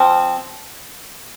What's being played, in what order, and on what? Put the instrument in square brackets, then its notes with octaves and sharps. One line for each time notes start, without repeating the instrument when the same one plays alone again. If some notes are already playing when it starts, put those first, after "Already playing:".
Already playing: [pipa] F3 C4